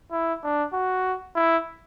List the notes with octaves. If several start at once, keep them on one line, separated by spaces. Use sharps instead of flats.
E4
D4
F#4
E4